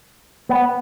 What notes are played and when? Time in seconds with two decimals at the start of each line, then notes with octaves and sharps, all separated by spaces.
0.49 B3